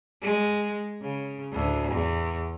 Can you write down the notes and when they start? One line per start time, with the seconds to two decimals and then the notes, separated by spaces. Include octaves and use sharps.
0.22 G#3
1.02 C#3
1.53 D2 A2
1.92 E2